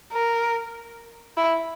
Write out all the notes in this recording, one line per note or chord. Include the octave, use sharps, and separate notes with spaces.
A#4
E4